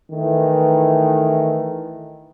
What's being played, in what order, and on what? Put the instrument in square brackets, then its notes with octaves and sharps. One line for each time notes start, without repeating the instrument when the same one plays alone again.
[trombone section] D#3 E3 A3